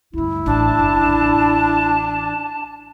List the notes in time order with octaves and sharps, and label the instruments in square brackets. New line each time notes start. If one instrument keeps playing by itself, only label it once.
[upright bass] D2 G2 [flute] E4
[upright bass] A1 A2 [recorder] D4 [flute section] A5
[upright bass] F#1
A1